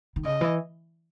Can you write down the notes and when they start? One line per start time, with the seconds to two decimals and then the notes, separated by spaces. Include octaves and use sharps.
0.16 D#3
0.25 C#3 D#5
0.41 E3